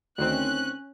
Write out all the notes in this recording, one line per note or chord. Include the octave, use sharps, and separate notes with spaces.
D2 D#3 C4 C#4 F#6